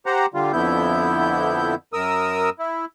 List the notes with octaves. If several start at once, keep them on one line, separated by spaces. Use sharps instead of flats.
G4 C5 F#5 A#5
D3 G3 F4
F2 D3 B3 E4 G6
F#2 A#4 D#6 E6
E4